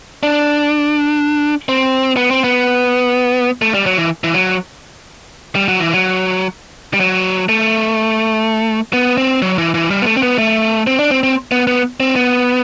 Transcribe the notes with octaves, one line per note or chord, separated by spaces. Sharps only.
D4
C4
B3
C4
B3
A3
G3
F#3
E3
E3
F#3
G3
F#3
E3
F#3
G3
F#3
A3
B3
C4
F#3
E3
E3
G3
B3
A3
C4
B3
A3
C4
D4
C4
C4
B3
B3
C4
B3